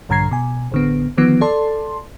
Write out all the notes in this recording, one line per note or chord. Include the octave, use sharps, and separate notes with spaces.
A#1 G2 D3 A#5 G#6 C7
B2 G#5
A1 D3 B3
D3 D#3 F3 B3
A4 D5 A5 C6